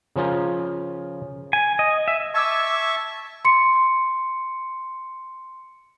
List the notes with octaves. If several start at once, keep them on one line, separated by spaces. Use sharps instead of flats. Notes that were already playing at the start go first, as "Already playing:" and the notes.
C#3 F3 C#4 F4 A#4
G#5
D#5
E5
E5 A5 C#6 D6 E6 G#6
C6 C#7